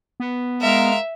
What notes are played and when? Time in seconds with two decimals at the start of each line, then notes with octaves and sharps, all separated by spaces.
0.20 B3
0.61 G#3 A#4 E5 F5